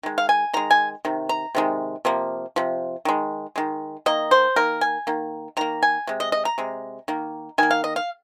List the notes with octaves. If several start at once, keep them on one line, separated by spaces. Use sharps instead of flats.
D#3 G#3
F5
G#5
D#3 G#3 A#5
G#5
C3 D#3
A#5
C3 D#3 G#3
C3 F3 A#3
C3 F3
D#3 G#3
D#3 G#3
D#3 A#3 D#5
C5
D#3 A#3 A#4
G#5
D#3 A#3
D#3 A#3 A#5
G#5
C3 G#3
D#5
D#5
A#5
C3 G#3
D#3 A#3
D#3 A#3 G#5
F5
D#5
F5